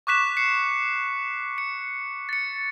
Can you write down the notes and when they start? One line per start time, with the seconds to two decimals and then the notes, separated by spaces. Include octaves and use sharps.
0.07 C#6 D6 F#6 B6 E7
0.37 C7 C#7
1.58 C#7
2.29 A6 C#7